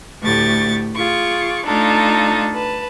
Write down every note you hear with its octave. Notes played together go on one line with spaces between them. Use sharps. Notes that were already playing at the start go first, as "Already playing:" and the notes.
D2 A2 A3 G4 C#6 A6
F4 G#4 C#6 D6
A3 D4 D#4 F4 A4
B4 A5